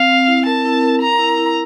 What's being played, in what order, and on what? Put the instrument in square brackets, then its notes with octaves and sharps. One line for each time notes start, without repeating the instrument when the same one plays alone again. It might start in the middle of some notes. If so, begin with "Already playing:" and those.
Already playing: [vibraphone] C4 [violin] F5
[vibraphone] C4
E4
[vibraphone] A#4 [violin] A5
[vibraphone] E4
A#4
[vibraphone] A#4 [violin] A#5
[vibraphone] E4
E4